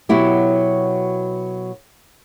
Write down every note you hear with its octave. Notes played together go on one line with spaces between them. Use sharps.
B2 F#3 B3 E4 G4